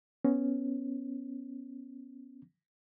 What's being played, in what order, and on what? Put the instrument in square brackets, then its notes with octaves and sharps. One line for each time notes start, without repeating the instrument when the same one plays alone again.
[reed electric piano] B3 C#4